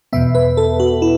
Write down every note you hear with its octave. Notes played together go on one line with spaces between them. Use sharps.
E2 B2 B3 E5
B4
A4
F#4
E4